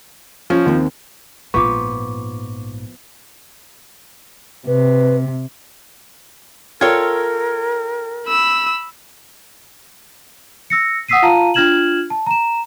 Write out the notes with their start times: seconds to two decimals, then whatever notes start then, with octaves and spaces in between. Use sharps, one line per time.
0.50 F3 C#4
0.66 D#2 C4
1.54 A#1 G#2 F3 B3 C#6 D6
4.67 C3 B4
6.81 F4 A4 A#4 C#5 G5 G#6
8.28 B5 E6
10.70 E6 A#6 C#7
11.08 F#5 D#6 E6 B6 C7 D#7
11.22 F4 F5 A5 A#5 D#7
11.54 D4 F4 F6 G#6 E7 F#7
12.10 A5
12.26 A#5 E7